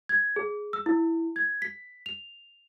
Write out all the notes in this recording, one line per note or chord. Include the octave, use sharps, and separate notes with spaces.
G#6
G#4
E6
E4
G#6
B6
F7